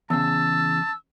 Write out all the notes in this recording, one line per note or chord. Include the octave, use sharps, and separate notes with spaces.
E2 C#3 A5 E6